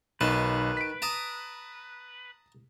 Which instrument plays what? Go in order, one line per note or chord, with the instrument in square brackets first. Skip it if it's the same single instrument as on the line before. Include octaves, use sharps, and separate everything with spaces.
[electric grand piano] B1 [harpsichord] D#3 A5 [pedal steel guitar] B4
[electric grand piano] B6 D7
[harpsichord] A5 A#5 D#6